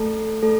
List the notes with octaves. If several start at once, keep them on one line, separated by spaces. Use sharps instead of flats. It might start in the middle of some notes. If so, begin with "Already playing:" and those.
Already playing: A3 A4
A3 A4